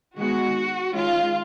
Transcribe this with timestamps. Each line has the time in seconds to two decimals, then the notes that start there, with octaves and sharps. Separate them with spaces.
0.18 D#3 G#3 B3 F#4
0.94 D#3 G#3 C#4 F4